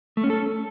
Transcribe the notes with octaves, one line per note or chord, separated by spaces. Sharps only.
A3
C#4
A4